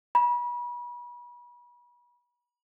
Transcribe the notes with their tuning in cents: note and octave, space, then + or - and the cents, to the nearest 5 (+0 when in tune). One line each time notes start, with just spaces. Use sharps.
B5 -35